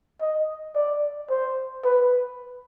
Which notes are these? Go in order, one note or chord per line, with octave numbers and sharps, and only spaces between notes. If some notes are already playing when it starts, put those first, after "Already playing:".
D#5
D5
C5
B4